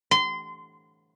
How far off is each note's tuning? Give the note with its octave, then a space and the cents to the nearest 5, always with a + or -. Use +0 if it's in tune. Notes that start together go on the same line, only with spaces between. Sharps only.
C6 -25